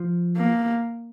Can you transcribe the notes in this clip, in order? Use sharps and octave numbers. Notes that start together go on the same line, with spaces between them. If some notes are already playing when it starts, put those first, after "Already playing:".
Already playing: F3
A#3